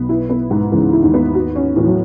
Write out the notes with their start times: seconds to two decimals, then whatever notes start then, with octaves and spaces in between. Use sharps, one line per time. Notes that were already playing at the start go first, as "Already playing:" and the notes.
Already playing: B1 B2 B3
0.09 E4
0.29 B3
0.51 G#2
0.72 C#2 C#3 E3
0.93 E4
1.03 D#2 D#3
1.14 B3
1.35 F#4
1.56 C#4
1.76 A2 E3
1.87 F#3